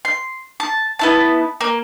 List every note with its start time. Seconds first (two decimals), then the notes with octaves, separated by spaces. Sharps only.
0.05 C6
0.60 A5
0.99 B3 E4 A5
1.61 A#3